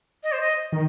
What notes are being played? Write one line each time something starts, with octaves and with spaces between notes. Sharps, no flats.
D#5
C5
D#5
D#3